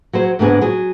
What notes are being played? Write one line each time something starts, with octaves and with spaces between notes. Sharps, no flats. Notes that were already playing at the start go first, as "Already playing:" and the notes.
F#3 G#4 C5
G#2 D3 G#3 B3 D4 G#4
F#3 G#4